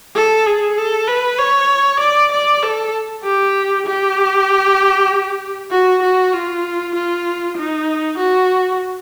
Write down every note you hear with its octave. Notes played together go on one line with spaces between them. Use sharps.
A4
G#4
A4
B4
C#5
D5
D5
A4
G4
G4
F#4
F#4
F4
F4
D#4
F#4